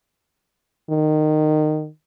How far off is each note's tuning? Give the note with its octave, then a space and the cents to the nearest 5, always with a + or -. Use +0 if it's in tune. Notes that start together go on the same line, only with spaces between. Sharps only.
D#3 -20